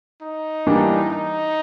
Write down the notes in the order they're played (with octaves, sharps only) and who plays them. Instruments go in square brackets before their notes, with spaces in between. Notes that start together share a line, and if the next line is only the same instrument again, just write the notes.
[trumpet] D#4
[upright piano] E3 G3 A#3 D4 G4
[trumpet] D#4